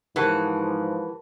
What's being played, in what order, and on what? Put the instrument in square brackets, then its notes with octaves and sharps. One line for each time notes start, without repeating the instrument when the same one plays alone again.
[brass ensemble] G#2 F3 [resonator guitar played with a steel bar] E3 F#4 [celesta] G4 A#4 A5